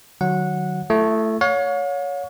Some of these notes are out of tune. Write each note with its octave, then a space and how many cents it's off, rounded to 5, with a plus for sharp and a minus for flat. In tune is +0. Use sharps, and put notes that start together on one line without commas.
D#3 -40 F#3 +0 F#5 -15
A3 +0 E4 +40
C#5 +20 F5 +45